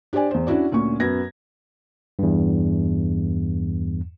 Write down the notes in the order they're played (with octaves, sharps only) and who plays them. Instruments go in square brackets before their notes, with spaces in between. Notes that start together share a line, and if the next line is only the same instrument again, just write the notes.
[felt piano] D4 G4 C5 D5 G#5
E2 C5
C#4 D4 E4 F#4 D5
D2 A#2 C#4 C#6
F#2 B3 G#6 A#6
[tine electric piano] E2 G2